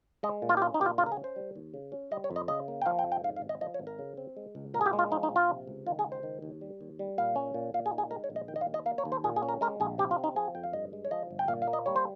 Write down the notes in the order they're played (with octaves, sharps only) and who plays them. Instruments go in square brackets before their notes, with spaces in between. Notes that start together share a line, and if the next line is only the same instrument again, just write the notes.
[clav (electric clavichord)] G#3 D#5
A#2
F4
G4
C#4 F4
D#4
A#2 G4
F4
C#3 F4
A#4
G#4
C#4
C5
G3
D#2
C#3
C#4
G3 D#5
C#5
F2
D#5
C#3 D#5
A#3
G5
F3 F5
G5
F2
G5
G#2 F5
F5
G#1
D#5
F3 D#5
C#5
G#1
A#4
C#3
C4
G#3
C#2
A#2 A#4
G#4
G4
G#3
F4
F3 D#4
D#4
A#1
F4
C3
C#2
D#3 F4
G#4
C#2
C5
D#3
D#2
G3
D#2
G3
A#2 F5
C#4
A#2
A#2 F5
G#4
D#4
G#4
G#3 A#4
C#5
A#1
D#5
D#3 G5
D#5
F5
D#2
D#5
A#3 F5
C#5
D#2
C5
A#2 G#4
G#4
C#4
A#4
G#3 A#4
A#1 G#4
C3 G4
F4
C4
D#4
F3 G#4
F2 G5
F5
G2 D#5
G#3
C#5
F3 D#5
G1
G5
A#2 F5
F5
A#3
D#5
G3 C#5
C5